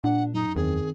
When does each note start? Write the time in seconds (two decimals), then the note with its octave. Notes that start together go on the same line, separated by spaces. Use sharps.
0.04 A#2 D4 F#5
0.34 F#2 D#4
0.56 E2 D#3 C4 G#4